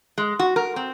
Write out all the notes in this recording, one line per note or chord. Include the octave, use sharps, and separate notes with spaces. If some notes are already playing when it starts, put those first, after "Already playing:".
G#3
F#4
A#4
C4